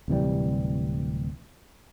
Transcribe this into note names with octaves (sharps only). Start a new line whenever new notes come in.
D1 C3 E3 G3